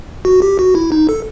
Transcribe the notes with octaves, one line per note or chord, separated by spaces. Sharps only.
F#4
G4
F#4
E4
D#4
A4